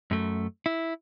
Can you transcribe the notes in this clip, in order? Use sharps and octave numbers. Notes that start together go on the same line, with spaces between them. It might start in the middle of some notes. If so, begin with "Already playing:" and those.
F#2 A3
E4